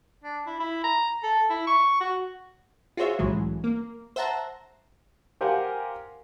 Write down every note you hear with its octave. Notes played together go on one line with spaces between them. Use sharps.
D4
E4
E4
A#5
A4
E4
C#6
F#4
F4 F#4 G#4 C5 C#5 E5
C2 A2 E3 F#3 G#3
A#3
C5 E5 F#5 A5 A#5
G4 A#4 C5 F5 F#5 G#5